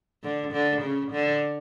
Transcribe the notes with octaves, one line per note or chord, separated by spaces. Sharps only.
D3
D3
C#3
D3